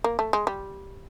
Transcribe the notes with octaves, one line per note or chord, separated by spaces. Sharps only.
A#3
A3
G#3
G3